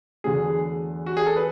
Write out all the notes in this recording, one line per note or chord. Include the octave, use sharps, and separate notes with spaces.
E2 D3 F#3 A3 G#4
F#4
G#4
A4
B4